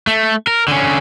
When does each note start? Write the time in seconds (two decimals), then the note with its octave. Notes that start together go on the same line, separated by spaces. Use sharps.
0.07 A3
0.47 A#4
0.68 D3 C#4